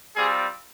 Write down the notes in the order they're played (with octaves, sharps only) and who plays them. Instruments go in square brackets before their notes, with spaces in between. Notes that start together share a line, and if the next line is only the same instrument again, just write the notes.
[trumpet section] G3 C4 F4 G#4